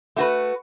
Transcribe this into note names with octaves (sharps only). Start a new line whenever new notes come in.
A3 F#4 B4